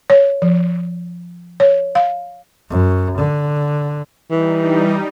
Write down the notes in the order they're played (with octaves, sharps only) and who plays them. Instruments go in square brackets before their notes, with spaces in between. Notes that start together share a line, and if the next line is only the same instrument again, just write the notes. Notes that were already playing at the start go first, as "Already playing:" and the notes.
[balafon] C#5
F3
C#5
F5
[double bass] F#2
D3
[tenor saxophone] E3 [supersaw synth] G3 D#4